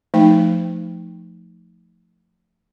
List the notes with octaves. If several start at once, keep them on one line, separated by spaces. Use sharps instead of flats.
F3 A3 D#4 G5